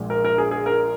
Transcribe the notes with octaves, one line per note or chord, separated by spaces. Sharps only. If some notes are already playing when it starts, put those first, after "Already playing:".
Already playing: A#1 A#2 G#3
A#4
A#4
G#4
G#4
A#4